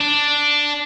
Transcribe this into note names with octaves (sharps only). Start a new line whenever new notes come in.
D4